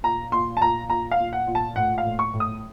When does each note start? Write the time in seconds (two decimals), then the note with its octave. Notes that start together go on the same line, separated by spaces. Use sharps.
0.03 A#2 A#5
0.32 A#2 C6
0.57 A5
0.62 A#2 A#5
0.90 A#2 A#5
1.11 F5
1.19 A#2
1.33 F#5
1.47 A#2
1.55 A5
1.76 A2 F#5
1.98 F5
2.05 A2
2.19 C#6
2.33 A2
2.40 D#6